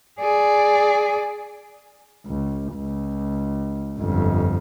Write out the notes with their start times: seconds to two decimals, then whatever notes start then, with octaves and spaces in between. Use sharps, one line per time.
0.20 G#4 D5
2.27 C#2
2.74 C#2
3.99 G1 F2